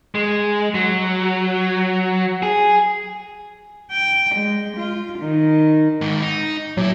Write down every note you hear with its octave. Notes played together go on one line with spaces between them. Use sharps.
G#3
F#3
G#4
G5
G#3
F4
D#3
G#2 D#3
D#4
A#2 F#3 E4